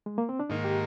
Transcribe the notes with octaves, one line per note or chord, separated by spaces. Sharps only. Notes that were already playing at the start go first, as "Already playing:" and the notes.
G#3
A#3
C4
D4
G#2 D#3 A#3 D#4
G4